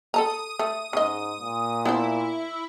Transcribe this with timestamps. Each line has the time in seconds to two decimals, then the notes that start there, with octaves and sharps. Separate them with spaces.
0.14 A4 A5 A#5 D#6
0.59 A3
0.93 G#2 C#3 D#5
1.40 A#2
1.85 B3 D4 E4 C5